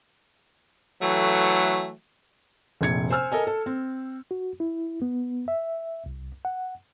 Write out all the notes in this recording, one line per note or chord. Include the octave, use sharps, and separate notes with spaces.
E3 F#3 A3
F1 A#1 G#6 C#7
C5 G#5 E6 F6
A4 A#4 D#5 G#5
A4
C4
F#4
E4
B3
E5
C2
F#5